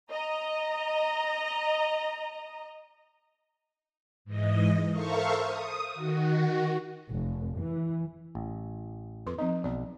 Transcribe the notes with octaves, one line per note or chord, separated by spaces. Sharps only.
D#5 A#5
G#2 E3 D#5
A4 A#4 C5 E5 F5 C#6
D#6
D#3 F#4
F1
E3
A1
F2 B4 C6
F3 C4 D#4 D#5
B1 D5